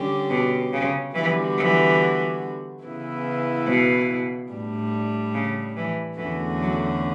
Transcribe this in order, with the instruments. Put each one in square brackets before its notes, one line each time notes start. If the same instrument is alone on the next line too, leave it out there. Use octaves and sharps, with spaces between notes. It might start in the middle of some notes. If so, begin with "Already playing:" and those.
Already playing: [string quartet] D3 G3 C#4 G4
[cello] B2
C#3
[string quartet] D3 G3 B3 F#4 [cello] E3
[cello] E3
[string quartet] C#3 E3 B3 E4
[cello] B2
[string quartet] A2 G3 D4
[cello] C#3
E3
[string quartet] E2 D3 A3 C#4 F#4 [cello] E3
[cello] F#3